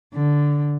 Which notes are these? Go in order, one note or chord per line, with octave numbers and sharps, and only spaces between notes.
D3